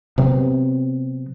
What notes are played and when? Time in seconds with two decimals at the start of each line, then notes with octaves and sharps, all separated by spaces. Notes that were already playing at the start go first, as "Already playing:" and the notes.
0.18 C3 F#3 B3 C4